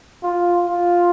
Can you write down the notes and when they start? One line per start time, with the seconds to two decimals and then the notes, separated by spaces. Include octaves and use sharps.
0.23 F4
0.67 F4